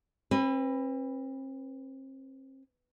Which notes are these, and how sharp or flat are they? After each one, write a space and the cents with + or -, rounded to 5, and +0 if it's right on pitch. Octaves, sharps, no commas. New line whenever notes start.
C4 +40 B4 +0